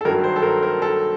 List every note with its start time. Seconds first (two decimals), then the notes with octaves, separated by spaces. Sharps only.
0.01 A4
0.05 G2 D#3 F#3 A#4
0.24 C5
0.36 A4
0.43 A#4
0.62 A#4
0.82 A4